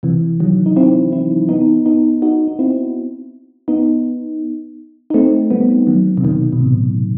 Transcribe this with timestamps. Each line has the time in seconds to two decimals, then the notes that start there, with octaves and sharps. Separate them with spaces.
0.03 C3 E3
0.40 D#3 F#3
0.66 D#4
0.76 C4 E4
1.12 C4 E4
1.49 B3 D#4
1.86 B3 D#4
2.22 D#4 F#4
2.47 D#4
2.59 C4 E4
3.68 B3 D#4
5.10 D#4
5.14 A3 C4
5.51 G3 B3
5.87 D#3 F#3
6.17 C3
6.24 B2 D#3
6.53 B2
6.60 A2 C3